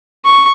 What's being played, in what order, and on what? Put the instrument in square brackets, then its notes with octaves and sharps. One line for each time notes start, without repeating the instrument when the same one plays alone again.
[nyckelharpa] C#6